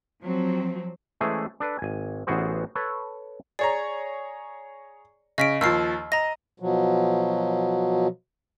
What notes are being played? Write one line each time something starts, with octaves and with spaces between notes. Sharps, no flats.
F3 F#3 C4
E3 G#3 A3 C#4 G#4 C5
D4 A4 B4
G#1 G#5
A1 E3 B3 F#4 G#4 C5
A4 B4 C#5
G#4 C#5 D5 A#5
C#3 D#5 B6 D7
D#2 F3 E6 F6 C7
D#5 A#5 A#6
B2 F3 F#3